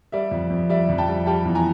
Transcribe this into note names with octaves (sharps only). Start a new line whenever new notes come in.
G3 D5 E5
F2
F2
G3 D5 E5
F2
G5 A5
G3
G3 G5 A5
E2
G#5 A#5